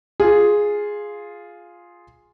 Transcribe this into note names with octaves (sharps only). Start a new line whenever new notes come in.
F4 G#4